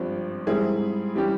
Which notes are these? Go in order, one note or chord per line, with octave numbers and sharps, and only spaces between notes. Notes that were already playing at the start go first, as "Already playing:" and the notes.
Already playing: G#1 G2 F3 C4
G#2 G3 C4 E4 G#4
E3 G3 C#4 G4